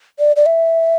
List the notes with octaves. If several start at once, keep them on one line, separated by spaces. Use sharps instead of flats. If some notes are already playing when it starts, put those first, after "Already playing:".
D5
D5
E5